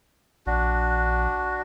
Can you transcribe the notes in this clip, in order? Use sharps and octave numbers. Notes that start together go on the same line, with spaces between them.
A#1 D4 F#4